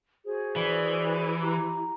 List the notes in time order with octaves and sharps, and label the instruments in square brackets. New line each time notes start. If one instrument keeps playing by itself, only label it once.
[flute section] F#4 G#4 C5
[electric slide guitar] E3 [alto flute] D5
[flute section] E4 G4 [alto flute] A#5